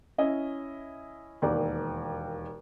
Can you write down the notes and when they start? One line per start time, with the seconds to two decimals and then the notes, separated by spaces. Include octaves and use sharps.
0.18 C#4 E4 D#5
1.42 E1 D#2 D5